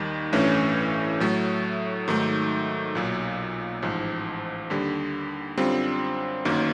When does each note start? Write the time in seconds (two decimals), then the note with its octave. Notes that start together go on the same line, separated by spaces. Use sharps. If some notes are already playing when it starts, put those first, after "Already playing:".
Already playing: D#2 D#3 G3
0.33 A1 G2 E3 A3 C#4
1.20 A2 F#3 A3
2.08 G#2 D#3 F#3 A3
2.95 B1 A#2 F#3
3.82 A1 G#2 F3
4.70 D#2 D3 G3
5.57 F#2 D3 G3 C4 F4
6.45 G1 F#2 D#3 F#3 A#3